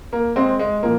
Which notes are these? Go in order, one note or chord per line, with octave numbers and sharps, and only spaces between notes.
A#3
G#3 C4
G#3
A#2 F3 A#3